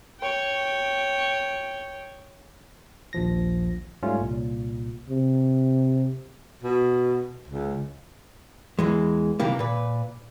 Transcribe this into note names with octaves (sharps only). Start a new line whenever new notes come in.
C#5 G5
A#1 D#2 F3 A#6
G#2 G3 A3 C#4 F4
C2 A#2
C3
B2
C#2
E2 E3 G#3
C3 D#3 E3 G3 A#3
A#2 B4